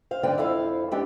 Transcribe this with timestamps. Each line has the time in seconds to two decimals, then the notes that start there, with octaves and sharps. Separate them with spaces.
0.11 C5 F5
0.23 G#2 D3 B4 D5 G5
0.38 F2 E4 A4 C5 F5
0.91 G#3 B3 C4 D4 G4